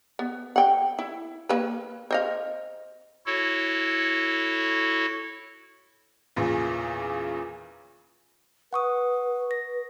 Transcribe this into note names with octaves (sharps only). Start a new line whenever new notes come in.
B3
F#5 G5
E4
A#3 B4
C5 D#5 F5
E4 F#4 A4 C#5
E2 A#2 C#3
B4 F#5 C#6 D#6
A#6